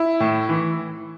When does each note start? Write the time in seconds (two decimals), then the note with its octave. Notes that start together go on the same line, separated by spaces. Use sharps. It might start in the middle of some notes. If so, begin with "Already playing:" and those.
Already playing: E4
0.20 A2
0.49 E3